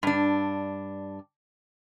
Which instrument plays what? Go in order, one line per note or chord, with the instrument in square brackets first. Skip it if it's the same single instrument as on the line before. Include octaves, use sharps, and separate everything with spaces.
[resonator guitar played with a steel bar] G2 D4